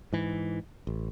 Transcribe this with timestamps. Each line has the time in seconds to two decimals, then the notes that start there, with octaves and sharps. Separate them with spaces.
0.13 G#2 E3
0.87 A1